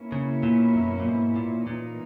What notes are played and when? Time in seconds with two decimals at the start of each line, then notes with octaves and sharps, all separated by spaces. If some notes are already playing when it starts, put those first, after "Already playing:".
Already playing: B2 A#3 C#4 E4
0.12 C#3
0.43 A#2
0.75 F#2
1.00 A#2
1.05 G#2
1.36 A#2
1.67 A#2 E3 A#3 D#4